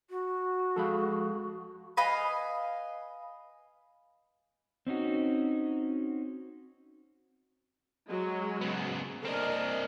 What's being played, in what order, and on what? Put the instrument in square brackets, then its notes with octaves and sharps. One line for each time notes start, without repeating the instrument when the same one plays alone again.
[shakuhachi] F#4
[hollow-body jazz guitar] F2 G#3 B5 [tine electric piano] A4 F5
[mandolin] B4 D#5 F5 G#5
[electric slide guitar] C4 C#4 D#4 F#4
[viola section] F#3 G#3
[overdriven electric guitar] C#3 B3
[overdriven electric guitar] C4 D4 [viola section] A#4 D#5